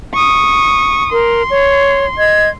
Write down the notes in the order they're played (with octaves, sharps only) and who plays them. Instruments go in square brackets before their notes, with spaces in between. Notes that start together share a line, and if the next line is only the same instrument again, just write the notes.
[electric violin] C#6 D#6
[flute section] A#4 [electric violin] C6
[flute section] C#5
D#5 G#6